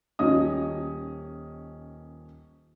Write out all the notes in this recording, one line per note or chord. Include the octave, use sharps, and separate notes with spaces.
D#1 D#3 C#4 D#5 D#6